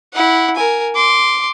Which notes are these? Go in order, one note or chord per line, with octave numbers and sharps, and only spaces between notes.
E4 F#5
A#4 G#5
C6 D6